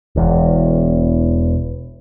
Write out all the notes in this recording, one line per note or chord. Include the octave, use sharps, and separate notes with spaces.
E1 E2